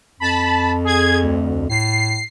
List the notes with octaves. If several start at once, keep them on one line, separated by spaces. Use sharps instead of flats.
F2 A5 B5
G#4 G#6
D2
A2 C7